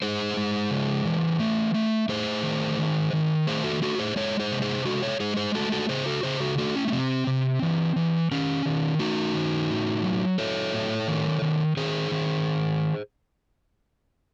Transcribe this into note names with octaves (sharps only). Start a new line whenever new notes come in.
G#3 G#4 C5
G#3
C#3
E3
A3
A3
A3 G#4 C5
D#3
D#3
D#3
A3 G#4 C5
F#4 A4
A3 F#4 A4
G#4 C5
G#3 A4 C#5
G#4 C5
C3
G#4 C5
G#3 F#4 A4
A4 C#5
G#3 G#4 C5
G#4 C5
A3 F#4 A4
F#4 A4
C#3 G#4 C5
F#4 A4
C#3 G#4 C5
F#4 A4
A3 F#4 A4
C#4
C#4
C3 C4
C3
E3
E3
D#3 C#4
D#3
A3 D#4 F#4
D#3
A2
F#3
F#3 A4 C#5
A2
D#3
D#3
D#3 G#4 C5
D#3